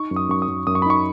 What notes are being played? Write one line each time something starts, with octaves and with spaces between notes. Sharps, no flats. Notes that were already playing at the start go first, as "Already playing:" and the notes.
Already playing: D#4 C#6
F#2
D#6
F#2 C#6
D#6
F#2
F#2 D#6
C#6
B5
D#4 C#6